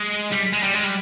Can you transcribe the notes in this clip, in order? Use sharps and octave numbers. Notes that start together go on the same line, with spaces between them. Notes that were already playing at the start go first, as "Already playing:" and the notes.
Already playing: G#3
G3
G#3
G3
G#3
G3